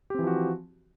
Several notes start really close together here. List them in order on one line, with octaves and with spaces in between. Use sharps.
G4 C4 E3 F3 F#4